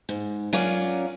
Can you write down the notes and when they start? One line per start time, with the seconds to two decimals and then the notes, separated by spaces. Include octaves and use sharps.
0.09 G#2
0.53 F#3 C#4 F4 A#4 D5